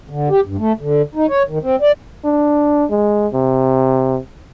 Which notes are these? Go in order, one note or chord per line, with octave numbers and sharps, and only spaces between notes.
D3
G4
G2
A3
D3
D#4
C#5
D#3
C4
D5
D4
G#3
C3